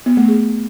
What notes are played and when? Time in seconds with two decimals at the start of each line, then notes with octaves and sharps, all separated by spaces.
0.06 B3
0.17 A3
0.28 G#4